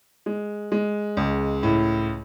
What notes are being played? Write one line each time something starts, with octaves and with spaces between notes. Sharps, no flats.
G#3
G#3
C#2
A2